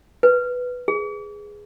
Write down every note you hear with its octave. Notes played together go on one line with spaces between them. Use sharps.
B4
G#4